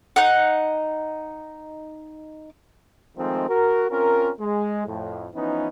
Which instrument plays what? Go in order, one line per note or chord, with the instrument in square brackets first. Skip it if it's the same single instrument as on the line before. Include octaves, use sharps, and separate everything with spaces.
[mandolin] D#4 F#5
[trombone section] D#3 F3 G#3 A3 C4 D#4
F#4 A#4
C4 C#4 F4 A#4
G#3
F2 A2
E3 F3 B3 C#4 D#4